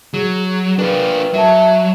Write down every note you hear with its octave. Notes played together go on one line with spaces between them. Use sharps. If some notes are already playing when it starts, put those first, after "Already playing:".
F#3 G#4
D4 F4 A#4 B4 G5
F#3 E5 A5